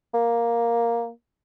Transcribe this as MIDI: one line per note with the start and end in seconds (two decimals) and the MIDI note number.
0.14 1.10 58